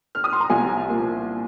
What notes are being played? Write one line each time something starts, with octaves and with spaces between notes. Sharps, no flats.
F6
D#6
C6
A#5
C2 G#5
A#2 A#3